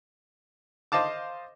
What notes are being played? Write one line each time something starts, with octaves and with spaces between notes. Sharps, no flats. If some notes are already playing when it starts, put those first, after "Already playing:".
C5 D#5 F5 A5 D6